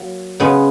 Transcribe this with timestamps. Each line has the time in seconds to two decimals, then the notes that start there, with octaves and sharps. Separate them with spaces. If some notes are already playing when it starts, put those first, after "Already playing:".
Already playing: F#3 A#3
0.40 C#3 G#3 B3